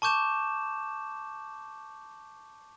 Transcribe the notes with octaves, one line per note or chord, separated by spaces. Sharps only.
A5 C#6 D6 G6 E7